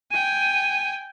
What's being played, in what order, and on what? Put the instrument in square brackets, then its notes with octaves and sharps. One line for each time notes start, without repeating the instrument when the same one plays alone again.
[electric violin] G5 G#5 [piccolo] D#7